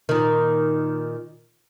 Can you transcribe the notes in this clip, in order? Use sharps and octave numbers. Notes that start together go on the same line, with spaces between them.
A#2 D#3